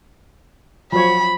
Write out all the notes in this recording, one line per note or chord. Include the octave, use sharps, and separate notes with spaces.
F3 F#3 C#5 B5